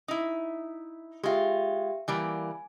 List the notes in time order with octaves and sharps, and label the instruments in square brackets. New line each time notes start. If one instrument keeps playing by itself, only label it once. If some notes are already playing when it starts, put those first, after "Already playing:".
[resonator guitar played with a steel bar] D#4 E4
[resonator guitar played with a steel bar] G#3 F4 [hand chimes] G4 E5 G5
[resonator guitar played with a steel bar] E3 G3 A#3 [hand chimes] G#5